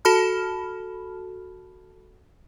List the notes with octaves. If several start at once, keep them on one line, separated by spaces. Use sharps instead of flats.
F#4 A4 A5 B5 F6